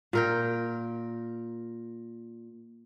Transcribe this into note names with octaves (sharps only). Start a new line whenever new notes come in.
A#2 A#4 G5